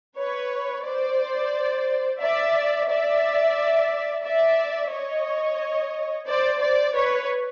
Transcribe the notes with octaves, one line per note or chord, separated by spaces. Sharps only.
B4 C#5
C5 D5
D5 E5
D5 E5
D5 E5
C#5 D#5
C5 D5
C5 D5
B4 C#5